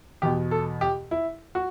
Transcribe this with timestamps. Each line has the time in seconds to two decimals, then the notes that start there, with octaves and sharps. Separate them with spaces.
0.22 E2 B2 G4
0.51 A4
0.81 G4
1.11 E4
1.55 F#4